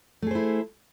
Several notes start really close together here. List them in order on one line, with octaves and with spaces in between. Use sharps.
A3 G#4 C5 E4